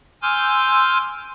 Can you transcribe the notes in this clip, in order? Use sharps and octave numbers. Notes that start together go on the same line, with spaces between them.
G#5 C6 D6 E6 F6 G6